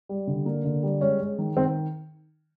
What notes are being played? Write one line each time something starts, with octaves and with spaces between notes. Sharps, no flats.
G3
D3
A#3
D3
G3
G#3 C#4
G#3
D#3
D#3 C4